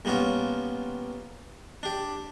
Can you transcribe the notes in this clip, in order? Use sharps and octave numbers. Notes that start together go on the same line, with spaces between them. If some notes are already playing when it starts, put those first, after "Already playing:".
A#2 G3 B3 C#4 F4
D4 G4